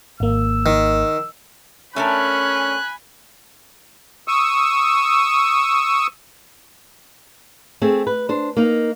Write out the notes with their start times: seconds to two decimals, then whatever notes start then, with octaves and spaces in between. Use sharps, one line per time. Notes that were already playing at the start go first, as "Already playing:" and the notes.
0.20 G#1 A#3 E6
0.66 D#3
1.96 A3 C#4 D4 A#4 G#5 B5 F#6
4.28 C#6 D#6 E6
7.82 A3 C4 G#4
8.07 B4
8.29 D4 C5
8.57 A#3 D#4